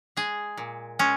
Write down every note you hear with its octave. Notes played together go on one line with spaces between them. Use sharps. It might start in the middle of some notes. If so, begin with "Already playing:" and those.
G#3 G#4
A#2
G#3 C#4